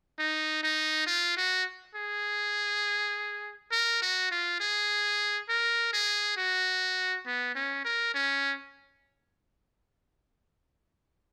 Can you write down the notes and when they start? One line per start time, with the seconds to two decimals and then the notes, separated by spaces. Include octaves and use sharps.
0.19 D#4
0.63 D#4
1.07 F4
1.37 F#4
1.95 G#4
3.72 A#4
4.02 F#4
4.31 F4
4.60 G#4
5.49 A#4
5.93 G#4
6.37 F#4
7.26 B3
7.55 C#4
7.85 A#4
8.14 C#4